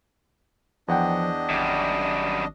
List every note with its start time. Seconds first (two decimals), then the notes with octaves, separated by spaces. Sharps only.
0.88 E2 F3 D4 D#5 F#5 G5
1.49 G#1 F#2 G3